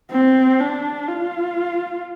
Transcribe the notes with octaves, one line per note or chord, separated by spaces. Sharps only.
C4
D4
F4